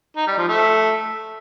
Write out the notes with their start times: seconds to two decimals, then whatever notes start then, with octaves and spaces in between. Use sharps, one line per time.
0.17 D#4
0.27 G3
0.38 F3
0.48 A3